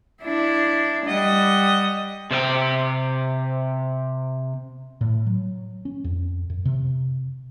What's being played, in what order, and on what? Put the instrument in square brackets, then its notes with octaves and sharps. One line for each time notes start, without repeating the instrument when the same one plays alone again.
[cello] D4 E4
[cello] G3 [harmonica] D#5 F#5
[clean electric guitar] C3 C5 D#5 G5
[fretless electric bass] A2
F#3
C#4
F2
F#2
C3